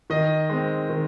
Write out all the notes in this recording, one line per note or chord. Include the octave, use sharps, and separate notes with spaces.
D#3 D#5
G#3 C4
D#3